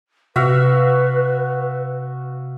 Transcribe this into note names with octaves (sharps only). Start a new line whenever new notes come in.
C3 F#4 B4 E5 F5